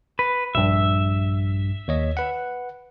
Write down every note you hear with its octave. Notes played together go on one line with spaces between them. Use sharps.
B4
A#1 G2 E5
D#2 C#5 D#5
B4 F#5